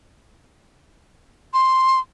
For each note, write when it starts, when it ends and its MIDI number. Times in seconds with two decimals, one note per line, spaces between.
1.54 2.00 84